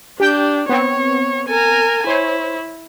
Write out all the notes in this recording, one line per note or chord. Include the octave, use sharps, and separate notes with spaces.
D4 G4 G5 G6
B3 C4 C#5
A#4 G#5
E4 C5 C#5